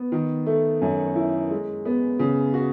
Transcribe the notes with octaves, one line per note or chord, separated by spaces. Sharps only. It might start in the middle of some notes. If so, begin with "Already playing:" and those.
Already playing: B3
D#3
A3
F#2
E4
G#3
B3
C#3
F#4